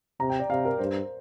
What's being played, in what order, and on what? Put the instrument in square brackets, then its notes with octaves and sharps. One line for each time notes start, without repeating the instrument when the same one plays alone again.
[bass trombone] C3 [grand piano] A#5
[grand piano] G5
D5
[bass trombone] C3 [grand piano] F5
[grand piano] A#4
[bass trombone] G2 [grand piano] C5